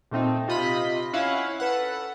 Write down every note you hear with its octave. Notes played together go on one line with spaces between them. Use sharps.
A#2 A3 C4 D#4
C3 F4 D#5 B5 B6
C#4 E4 F5 F#5
A4 B4 F#5